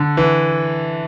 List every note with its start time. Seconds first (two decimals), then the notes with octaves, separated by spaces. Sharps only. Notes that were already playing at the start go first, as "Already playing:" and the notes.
Already playing: D3
0.17 E3